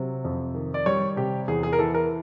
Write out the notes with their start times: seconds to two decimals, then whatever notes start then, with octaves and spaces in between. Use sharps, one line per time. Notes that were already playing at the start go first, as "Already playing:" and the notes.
Already playing: C3 F#3
0.25 F2
0.55 D#3
0.74 D5
0.86 G3 C#5
1.16 C3 G4
1.48 E2 G#4
1.63 G#4
1.73 A#4
1.79 E3 A4
1.94 A#4